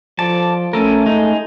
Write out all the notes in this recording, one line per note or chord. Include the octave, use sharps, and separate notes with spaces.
F3 A4 D5 A5
A3 C#4 A4 A#4
G#3 D#4